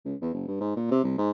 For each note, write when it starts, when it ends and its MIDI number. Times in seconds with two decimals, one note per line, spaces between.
0.05 0.15 37
0.21 0.30 40
0.34 0.43 30
0.47 0.56 43
0.60 0.74 44
0.76 0.89 46
0.91 1.04 48
1.04 1.16 36
1.18 1.31 44